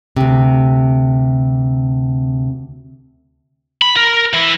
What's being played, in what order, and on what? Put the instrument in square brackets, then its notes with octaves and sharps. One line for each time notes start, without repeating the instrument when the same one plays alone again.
[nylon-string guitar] D2 C3
[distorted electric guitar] B5
A#4
E3 E4